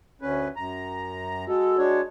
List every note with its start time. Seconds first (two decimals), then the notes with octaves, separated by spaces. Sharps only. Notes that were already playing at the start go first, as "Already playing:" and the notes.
0.22 D2 C#4 B4
0.56 F#2 A#5
1.48 G#3 F#4 A4
1.78 G#3 D4 C#5